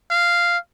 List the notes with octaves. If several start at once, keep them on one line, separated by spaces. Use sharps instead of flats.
F5